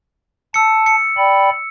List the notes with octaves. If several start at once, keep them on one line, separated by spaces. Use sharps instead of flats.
A5 E6 C#7
C#7
D5 G5 B5